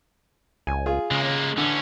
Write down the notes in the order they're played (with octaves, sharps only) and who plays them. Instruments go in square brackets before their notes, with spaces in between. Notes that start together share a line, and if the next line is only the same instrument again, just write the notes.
[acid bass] C#2 [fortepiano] G#5
[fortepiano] F4 G#4
[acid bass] C#3 [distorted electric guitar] G#3 A#3
[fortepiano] D3 [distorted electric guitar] E3 C#4